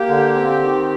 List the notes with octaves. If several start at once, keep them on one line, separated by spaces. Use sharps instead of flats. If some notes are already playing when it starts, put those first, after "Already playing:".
Already playing: A#3 G4
D3
C4
D#3